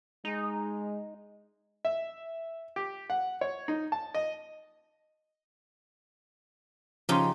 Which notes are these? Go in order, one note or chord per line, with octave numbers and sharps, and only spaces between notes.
G#3 D#4
E5
G4
F#5
C#5
D#4
A5
D#5
C#3 F3 D#4 G4 C6